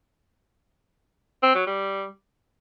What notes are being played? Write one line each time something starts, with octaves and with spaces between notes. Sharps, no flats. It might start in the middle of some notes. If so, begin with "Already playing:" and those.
C4
F#3
G3